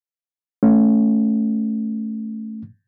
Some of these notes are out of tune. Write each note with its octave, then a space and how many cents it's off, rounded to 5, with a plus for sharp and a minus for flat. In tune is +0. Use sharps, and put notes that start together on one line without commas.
A3 +0 C#4 +0